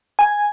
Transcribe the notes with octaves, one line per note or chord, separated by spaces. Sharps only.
G#5